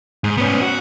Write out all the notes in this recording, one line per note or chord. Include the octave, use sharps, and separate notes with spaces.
G#2
B3 C#4
F#4